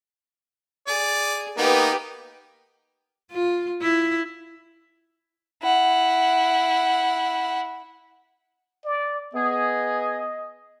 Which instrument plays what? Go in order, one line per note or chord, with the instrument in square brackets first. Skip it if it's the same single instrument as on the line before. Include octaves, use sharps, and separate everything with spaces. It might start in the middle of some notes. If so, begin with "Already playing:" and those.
[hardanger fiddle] G#4 [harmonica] D5
[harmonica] A#3 B3 D#4 [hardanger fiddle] G4 B4
[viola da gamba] F4
E4
[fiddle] E4 F#5
[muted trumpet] D5
[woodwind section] B3 G#4 [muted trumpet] D#5